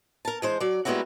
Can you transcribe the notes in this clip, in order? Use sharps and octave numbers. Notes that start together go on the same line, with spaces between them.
A#4 A5
E3 G#3 C5
F#3 D5
G3 G#3 A#3 B3 E4 F#4